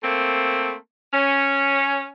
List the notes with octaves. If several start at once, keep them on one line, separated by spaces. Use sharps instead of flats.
A3 A#3 C4
C#4